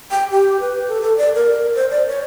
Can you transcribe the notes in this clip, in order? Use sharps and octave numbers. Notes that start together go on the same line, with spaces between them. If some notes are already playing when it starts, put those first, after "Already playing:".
G5
G4
B4
A4
A4
D5
A#4
C5
D5
C#5